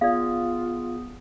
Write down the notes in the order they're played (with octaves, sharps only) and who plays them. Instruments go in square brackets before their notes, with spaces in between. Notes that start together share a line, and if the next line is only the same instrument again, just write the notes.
[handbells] B3 G#4 [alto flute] F4 [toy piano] D5 F5